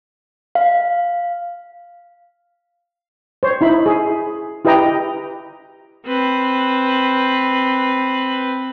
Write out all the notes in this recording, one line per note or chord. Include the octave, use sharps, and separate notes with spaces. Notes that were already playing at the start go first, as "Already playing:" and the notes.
F5
C5 C#5
D#4 E4 B5
G#4
E4 G4 B4 D#5 G5 A#5
C4 B4